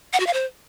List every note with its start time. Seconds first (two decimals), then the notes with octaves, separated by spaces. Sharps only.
0.13 F#5
0.20 F#4
0.27 F5
0.33 C5